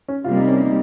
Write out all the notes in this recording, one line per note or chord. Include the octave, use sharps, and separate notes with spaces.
C#4
C3 G3 A#3 F4
D#4
C#4
D#4